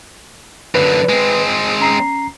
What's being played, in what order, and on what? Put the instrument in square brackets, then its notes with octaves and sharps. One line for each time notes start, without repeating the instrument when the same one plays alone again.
[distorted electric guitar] F#2 D3 [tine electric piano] B4
[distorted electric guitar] G#3 C4
[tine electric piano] C#4 A#5 C7